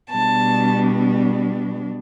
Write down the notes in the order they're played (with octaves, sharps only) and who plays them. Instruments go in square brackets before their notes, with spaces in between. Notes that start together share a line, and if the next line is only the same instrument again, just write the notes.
[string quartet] B2 G3 B3 D4 A5